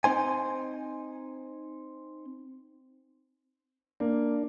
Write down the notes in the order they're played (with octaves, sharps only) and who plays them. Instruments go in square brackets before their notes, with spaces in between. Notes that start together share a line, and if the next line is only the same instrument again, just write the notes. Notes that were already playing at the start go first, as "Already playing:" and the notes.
[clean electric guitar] C4 D#4 C5 G#5
[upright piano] A#3 [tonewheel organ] D4